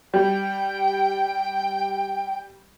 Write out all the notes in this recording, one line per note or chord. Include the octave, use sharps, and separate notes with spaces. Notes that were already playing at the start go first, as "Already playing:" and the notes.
G3 G5